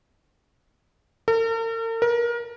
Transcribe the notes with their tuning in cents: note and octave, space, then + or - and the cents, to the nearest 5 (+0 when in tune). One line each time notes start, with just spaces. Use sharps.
A#4 -45
A#4 +30